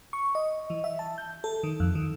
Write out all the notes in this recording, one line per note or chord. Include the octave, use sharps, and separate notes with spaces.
C#6
D#5
E3
E5
A5
G6
A4
D#3
F2
D#3